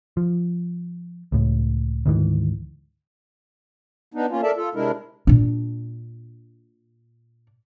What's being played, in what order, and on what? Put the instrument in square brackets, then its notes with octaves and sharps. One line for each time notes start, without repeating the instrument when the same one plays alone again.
[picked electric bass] F3
C#2 A2
D2 G#2 D#3 E3
[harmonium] B3 D4 D#4
A#3 C#4 F4
A4 A#4 D5 E5 A5
F4 A4
C3 G#3 D4 E4 A#4
[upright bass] A#2 D4